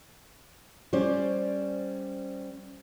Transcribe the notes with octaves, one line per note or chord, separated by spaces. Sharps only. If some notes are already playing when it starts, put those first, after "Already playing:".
G3 C#4 C5 D5